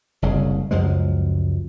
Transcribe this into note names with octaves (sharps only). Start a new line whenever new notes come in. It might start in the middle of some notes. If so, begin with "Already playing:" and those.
F#1 C2 C#3
C#2 F#2 F3 G#3